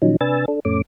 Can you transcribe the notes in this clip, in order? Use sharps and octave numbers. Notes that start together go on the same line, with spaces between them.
A#2 D#3 F3 F#3 C#4 D#4
C3 D4 B4 G#5 E6 A6
D4 A4
F2 A2 A3 C#4 D6